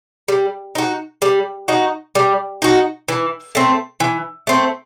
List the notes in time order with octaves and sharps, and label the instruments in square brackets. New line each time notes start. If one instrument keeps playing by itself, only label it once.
[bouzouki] G3
D#4 F#4
G3
D#4 F#4
G3
D#4 F#4
E3
A3 C4
E3
A3 C4